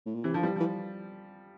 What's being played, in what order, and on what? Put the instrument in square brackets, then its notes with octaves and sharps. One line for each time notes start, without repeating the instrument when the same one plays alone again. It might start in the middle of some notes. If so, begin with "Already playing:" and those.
[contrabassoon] A2
A#2
[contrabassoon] C3 [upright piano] E3
[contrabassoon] D3 [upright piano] F3
[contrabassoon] E3 [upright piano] G3
[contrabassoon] E3 [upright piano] F3